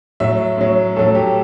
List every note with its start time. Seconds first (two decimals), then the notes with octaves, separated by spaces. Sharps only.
0.20 A2 F#3 E5
0.58 A2 F#3
0.96 A2 F#3 A4
1.15 G4